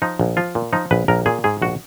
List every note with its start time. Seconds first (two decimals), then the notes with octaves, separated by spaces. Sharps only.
0.02 F3 D#4
0.20 A#1
0.37 F3 F4
0.55 A#2
0.73 F3 D#4
0.91 A#1 B4
1.08 A#1 A#4
1.26 A#2 G#4
1.44 G#2 G#4
1.62 A#1 F#4